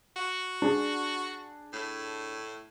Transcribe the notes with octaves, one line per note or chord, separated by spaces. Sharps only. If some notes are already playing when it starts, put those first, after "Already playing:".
F#4
D4 G#4
A2